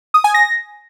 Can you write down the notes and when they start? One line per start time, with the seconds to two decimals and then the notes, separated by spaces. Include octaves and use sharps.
0.14 D#6
0.24 G#5
0.34 A#6